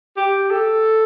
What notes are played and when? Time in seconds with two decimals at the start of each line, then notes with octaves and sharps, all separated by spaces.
0.17 G4
0.51 A4